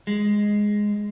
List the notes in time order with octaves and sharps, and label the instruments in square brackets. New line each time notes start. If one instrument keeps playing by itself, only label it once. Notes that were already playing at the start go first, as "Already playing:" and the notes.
[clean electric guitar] G#3